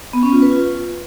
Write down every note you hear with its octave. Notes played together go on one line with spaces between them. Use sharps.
B3
C#4
F4
B4
F4